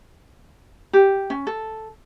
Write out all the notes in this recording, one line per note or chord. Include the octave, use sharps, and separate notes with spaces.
G4
C#4
A4